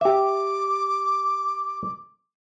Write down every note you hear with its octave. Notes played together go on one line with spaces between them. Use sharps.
G4 E5 D6